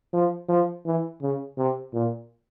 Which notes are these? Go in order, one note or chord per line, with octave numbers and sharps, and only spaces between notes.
F3
F3
E3
C#3
C3
A#2